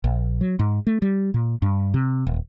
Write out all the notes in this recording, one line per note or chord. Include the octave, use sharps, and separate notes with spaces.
A#1
F#3
G#2
A3
G3
A#2
G2
C3
D#1